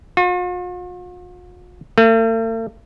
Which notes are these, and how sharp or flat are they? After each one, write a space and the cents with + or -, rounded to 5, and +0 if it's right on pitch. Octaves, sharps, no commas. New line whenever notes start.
F4 +45
A3 +45